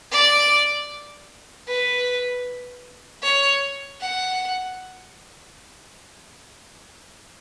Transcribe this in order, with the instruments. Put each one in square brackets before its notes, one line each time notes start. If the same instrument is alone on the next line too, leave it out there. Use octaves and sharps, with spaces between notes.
[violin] D5
B4
C#5
F#5